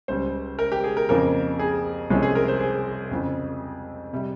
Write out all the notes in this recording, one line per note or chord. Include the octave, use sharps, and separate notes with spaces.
C#2 C#3 G3 C5
A#4
G4
G#4
A#4
F2 C#3 F3 A#3 A#4
G#4
C2 C3 F3 G#3 C#4
G#4
A#4
C5
G#4
F2 C#3 F3
C3 G3